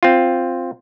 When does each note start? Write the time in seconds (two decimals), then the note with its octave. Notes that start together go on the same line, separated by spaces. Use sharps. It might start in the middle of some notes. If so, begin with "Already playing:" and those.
0.03 C4 F4